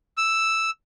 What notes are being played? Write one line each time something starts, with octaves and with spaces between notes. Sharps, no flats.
E6